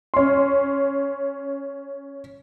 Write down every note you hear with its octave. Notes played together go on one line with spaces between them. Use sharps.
C#4 C6